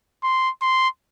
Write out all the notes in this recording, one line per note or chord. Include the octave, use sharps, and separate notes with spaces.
C6
C6